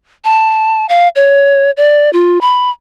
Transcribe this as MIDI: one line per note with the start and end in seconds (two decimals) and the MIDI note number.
0.25 0.86 81
0.89 1.08 77
1.16 1.71 73
1.77 2.10 74
2.13 2.41 65
2.41 2.70 83